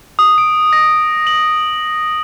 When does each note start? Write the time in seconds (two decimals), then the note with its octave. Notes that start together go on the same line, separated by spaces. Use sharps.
0.19 D#6
0.38 D7
0.73 A#6
1.27 F#7